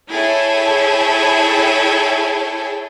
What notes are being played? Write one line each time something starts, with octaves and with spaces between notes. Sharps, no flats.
E4 G#4 A4 C#5 G5